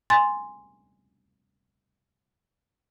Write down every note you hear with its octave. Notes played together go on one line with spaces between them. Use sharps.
G#5 C6 A6